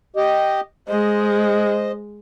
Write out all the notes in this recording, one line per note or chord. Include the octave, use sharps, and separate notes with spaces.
G4 D#5
G#3 C5 D#5